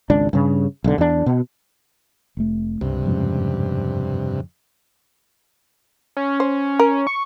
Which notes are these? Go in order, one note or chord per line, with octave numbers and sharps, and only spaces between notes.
G#1 C#2 D4
G2 C#3
B1 D3
E2 D4
B2
F1 A3
C#2 G2 C3
F2 G#2 C#3
C#4
C5
A#4
C#6